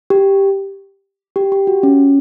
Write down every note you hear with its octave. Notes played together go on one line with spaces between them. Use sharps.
G4
G4
G4
F#4
C#4